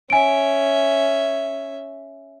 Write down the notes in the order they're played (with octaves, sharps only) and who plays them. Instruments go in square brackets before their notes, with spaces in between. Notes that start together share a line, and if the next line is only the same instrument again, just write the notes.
[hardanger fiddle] C#4 E5 [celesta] G#5 D7